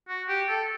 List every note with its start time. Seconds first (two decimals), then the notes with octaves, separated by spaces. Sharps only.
0.09 F#4
0.28 G4
0.49 A4